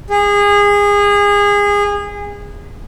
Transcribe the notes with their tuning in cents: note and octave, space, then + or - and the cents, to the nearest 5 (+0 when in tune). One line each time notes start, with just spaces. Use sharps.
G#4 -25